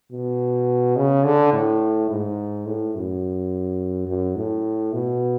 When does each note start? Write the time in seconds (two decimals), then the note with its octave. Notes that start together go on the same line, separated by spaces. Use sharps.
0.12 B2
0.96 C#3
1.25 D3
1.53 A2
2.10 G#2
2.66 A2
2.95 F#2
4.07 F#2
4.36 A2
4.93 B2